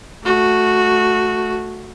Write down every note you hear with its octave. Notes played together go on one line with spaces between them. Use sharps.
A3 F#4